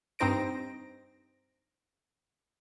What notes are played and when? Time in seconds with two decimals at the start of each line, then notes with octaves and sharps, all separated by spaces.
0.19 G2 C4 D#4 C5 A#6 D7